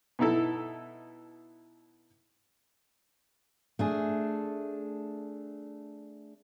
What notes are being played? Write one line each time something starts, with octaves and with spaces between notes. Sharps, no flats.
B2 D#4 E4 A4
A3 D4 G#4